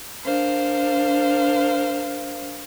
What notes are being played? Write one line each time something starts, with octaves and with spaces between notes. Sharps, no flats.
D4 A#4 C5 F5